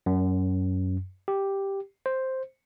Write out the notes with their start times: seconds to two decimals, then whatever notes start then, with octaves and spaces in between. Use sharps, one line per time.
0.06 F#2
1.28 G4
2.06 C5